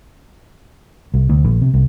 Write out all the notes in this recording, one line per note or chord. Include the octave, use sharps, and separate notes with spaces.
C2
D2
A#1
C3
C2